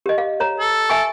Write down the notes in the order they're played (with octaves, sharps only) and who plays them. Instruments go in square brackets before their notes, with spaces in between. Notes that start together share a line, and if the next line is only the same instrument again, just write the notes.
[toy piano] G4 D#5
F5
C#5 A#5
[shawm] A4
[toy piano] E5 G#5 C#6